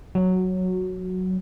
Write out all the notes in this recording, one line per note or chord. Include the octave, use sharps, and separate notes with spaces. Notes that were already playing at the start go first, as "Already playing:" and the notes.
F#3